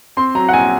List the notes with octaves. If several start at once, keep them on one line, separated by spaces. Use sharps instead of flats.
C4 C6
F#3 A#5
F#5
A#1 G#5